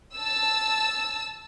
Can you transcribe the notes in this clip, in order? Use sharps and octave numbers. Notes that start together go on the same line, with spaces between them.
A5 E6